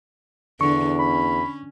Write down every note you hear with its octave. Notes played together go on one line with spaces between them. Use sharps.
E2 D3 C#6
C#4 B5